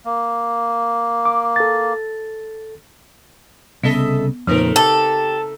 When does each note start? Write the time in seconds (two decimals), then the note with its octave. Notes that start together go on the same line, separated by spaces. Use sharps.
0.05 A#3
1.25 D6
1.56 A4 A6
3.84 C2 C#3 B3 A4 D#5 E5
4.47 F2 A#2 C#3 A3 C4 D#4 A#4 B4
4.76 G4 A4